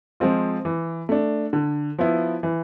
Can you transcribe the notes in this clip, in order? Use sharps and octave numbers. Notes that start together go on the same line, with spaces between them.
F3 G#3 C4 F4
E3
A3 D4
D3
F3 B3 E4
E3